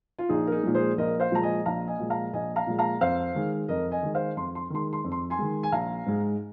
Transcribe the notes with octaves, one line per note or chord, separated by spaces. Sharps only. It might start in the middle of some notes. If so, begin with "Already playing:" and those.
F4
A#1 D#4 G#4
A#4
D#4 G#4
A#2 F3 G#3
G#4 C5
A#1 A#4 D#5
C5 F5
A#2 F3 G#3 A#5
D#5 G#5
A#1 F5 A#5
D#5 G#5
A#2 F3 G#3
F5 A#5
A#1 D#5 G#5
F5 A#5
A#2 F3 G#3
F5 A#5
F2 C5 F5
D#3 G#3
F2 A#4 D#5
D#5 G#5
D#3 G#3
C5 F5
F2 C6
C6
D#3 G#3 C6
C6
F2
C6
G#5 C6
D#3 G#3
G#5
A#1 F5 A#5
G#2 G#3